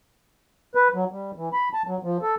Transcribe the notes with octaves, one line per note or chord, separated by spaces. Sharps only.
B4
F#3
G3
E3
B5
A5
F#3
F3
A4